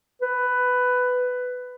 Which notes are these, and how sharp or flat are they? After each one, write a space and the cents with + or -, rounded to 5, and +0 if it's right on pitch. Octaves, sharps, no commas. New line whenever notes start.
B4 +10